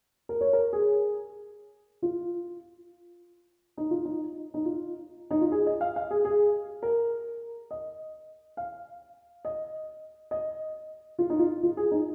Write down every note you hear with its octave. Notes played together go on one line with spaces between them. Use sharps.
A#4
C#5
A#4
G#4
F4
D#4
F4
D#4
D#4
F4
D#4
F4
G#4
D#5
F5
F5
G#4
G#4
A#4
D#5
F5
D#5
D#5
F4
D#4
F4
F4
G#4
D#4